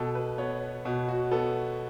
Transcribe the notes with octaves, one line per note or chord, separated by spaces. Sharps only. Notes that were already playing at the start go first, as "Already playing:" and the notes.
Already playing: B2 A4
B4
B3 C#5
B2
F#4
B3 A4